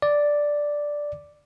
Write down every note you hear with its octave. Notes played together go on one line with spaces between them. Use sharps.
D5